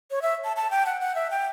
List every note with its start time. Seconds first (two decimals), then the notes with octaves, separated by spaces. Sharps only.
0.11 C#5
0.22 E5
0.44 A5
0.56 A5
0.71 G5
0.86 F#5
1.01 F#5
1.15 E5
1.30 G5